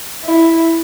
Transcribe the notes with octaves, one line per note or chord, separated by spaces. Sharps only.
E4